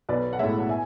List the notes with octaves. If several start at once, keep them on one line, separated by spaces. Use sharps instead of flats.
B1 B4 D5
F#5
A2 G#3 C#5 E5
F#5
E5 G#5